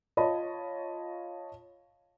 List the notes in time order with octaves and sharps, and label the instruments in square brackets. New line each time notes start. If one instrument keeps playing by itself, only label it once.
[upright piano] F4 C#5 D#5 A5 B5